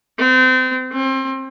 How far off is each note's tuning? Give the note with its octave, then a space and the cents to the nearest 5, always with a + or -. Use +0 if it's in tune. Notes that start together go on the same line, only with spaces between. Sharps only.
C4 -30
C4 +30